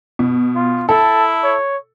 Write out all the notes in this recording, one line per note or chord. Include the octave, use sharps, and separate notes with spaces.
B2
F4
E4 A4 A5
C#5